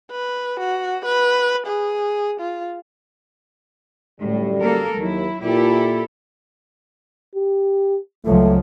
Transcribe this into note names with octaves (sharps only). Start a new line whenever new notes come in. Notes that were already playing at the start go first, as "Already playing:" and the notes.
B4
F#4
B4
G#4
F4
F#2 A2 D3 G3
A#3 A4 A#4
D#2 F#3 E4
A#2 E4 G4 A4
G4
C#2 F3 F#3 A3